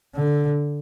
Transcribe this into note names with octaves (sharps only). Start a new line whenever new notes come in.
D3